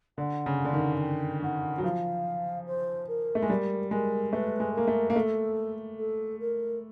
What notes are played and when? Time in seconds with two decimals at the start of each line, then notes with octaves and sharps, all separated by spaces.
0.18 D3 F#5
0.46 C#3
0.65 D3
0.74 D#3
1.01 G5
1.42 D#3 F#5
1.78 F#3
1.84 F3 F5
2.67 C5
3.08 A#4
3.35 A3
3.42 G#3
3.49 G3 A#4
3.91 G#3 A#4
4.32 A3 B4
4.60 G#3
4.73 A#3 A#4
4.87 A3
5.10 A#3 A#4
5.15 A3 A4
5.98 A4
6.40 A#4